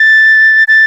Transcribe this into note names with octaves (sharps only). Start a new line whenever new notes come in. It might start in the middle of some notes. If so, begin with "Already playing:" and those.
Already playing: A6
A6